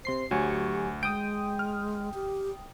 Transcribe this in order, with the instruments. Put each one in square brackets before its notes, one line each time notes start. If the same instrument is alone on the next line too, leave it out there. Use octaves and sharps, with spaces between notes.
[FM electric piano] C3 C6 C7 [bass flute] C5
[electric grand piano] D2 [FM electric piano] F#3 G#5 C#6 [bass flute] G4
[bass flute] G#3 [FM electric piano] G5 D#6 [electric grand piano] D7
[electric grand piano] F6
[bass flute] G4